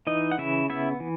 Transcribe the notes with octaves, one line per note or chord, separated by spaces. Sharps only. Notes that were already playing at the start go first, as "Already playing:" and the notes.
E3 D#4 D#5
F#5
C#3 E4 E5
B3 E4 E5
E3